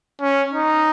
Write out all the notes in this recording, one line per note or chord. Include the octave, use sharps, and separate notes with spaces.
C#4
D#4